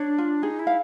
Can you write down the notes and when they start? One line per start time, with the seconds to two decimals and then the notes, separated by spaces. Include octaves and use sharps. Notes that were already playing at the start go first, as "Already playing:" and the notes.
Already playing: D4 C#5
0.18 F4
0.43 D#4 G#4
0.59 E4
0.67 F5